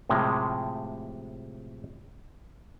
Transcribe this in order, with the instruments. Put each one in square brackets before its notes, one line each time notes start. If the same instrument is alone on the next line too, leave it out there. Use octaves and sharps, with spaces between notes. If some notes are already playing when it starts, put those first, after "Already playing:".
[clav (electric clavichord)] A2 C3 F3 G#3